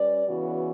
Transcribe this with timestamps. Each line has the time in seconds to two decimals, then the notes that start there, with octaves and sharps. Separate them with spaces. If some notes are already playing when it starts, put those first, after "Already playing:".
Already playing: G3 C#4 B4 D5
0.27 C#3 E3 B3 F#4